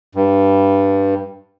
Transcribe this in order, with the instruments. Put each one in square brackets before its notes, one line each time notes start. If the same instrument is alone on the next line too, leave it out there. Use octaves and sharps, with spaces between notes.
[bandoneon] G2